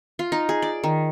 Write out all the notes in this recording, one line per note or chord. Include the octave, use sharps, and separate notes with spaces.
F4
D#4
G#4
D5
D#3